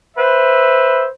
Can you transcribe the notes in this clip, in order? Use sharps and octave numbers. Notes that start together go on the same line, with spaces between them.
B4 C5 E5